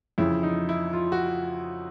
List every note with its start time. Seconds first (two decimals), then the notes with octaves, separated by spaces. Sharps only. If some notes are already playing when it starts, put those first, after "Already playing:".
0.18 F2 C#3 E3 E4
0.43 D#4
0.69 E4
0.93 F4
1.12 F#4